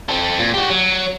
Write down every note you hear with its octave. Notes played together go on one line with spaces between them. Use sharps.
C4 A4
A#2
F#4 G4
F#3